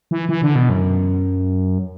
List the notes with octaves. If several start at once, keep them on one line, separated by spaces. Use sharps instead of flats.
E3
E3
D3
B2
F#2